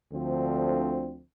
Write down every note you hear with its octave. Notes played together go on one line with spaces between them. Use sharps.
D2 D3 F3 C4